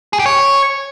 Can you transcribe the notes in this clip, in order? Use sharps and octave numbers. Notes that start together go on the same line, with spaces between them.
G#4
G4
C#5